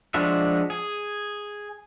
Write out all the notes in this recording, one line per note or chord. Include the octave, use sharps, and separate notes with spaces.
F3 G#3 D4 F#4 E5
G#4